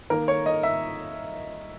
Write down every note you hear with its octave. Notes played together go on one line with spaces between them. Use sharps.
D#3 A#3 A#4
C#5
D#5
E5